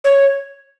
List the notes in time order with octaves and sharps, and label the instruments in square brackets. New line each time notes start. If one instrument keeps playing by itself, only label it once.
[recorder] C#5